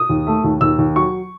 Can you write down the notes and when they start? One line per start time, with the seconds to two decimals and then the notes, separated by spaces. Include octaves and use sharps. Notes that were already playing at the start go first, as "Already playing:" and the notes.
Already playing: D#6
0.09 D#2
0.27 A3
0.44 D#2
0.61 D#2 E6
0.78 D#2
0.96 F#3 C#6